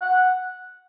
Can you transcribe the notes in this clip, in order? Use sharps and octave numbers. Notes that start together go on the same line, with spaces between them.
F#5